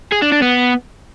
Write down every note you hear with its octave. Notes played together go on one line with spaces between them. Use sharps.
G#4
D4
D4
B3